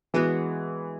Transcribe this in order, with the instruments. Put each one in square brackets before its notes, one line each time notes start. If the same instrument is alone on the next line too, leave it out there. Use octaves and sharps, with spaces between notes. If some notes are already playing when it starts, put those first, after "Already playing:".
[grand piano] E3 [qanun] G#3 B3 F#4